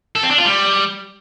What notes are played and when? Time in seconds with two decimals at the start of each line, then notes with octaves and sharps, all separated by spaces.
0.15 A4
0.23 C4
0.31 D4
0.38 F4
0.46 G3